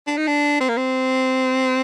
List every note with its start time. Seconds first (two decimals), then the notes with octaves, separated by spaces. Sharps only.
0.07 D4
0.17 D#4
0.27 D4
0.61 C4
0.69 A#3
0.77 C4